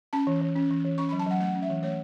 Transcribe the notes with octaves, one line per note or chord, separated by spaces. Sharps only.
C#4 A5
E3
E3
C#4
E3
E3
C#4 C#6
B5
F#3
A5
F#3 F#5
A3 F#5
C#4
E5
E3
A3 C#5